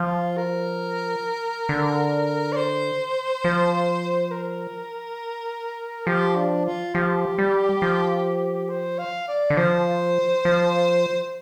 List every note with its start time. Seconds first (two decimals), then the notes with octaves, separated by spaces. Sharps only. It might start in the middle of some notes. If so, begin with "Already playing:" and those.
Already playing: F3 F4
0.37 A#4
1.69 D3
2.52 D5
2.56 C5
3.44 F3
4.31 A#4
6.07 F3 G4
6.36 D4
6.65 F4
6.95 F3 G4
7.38 G3
7.82 F3
8.69 C5
8.98 F5
9.28 D5
9.50 D3
9.57 F3 C5
10.45 F3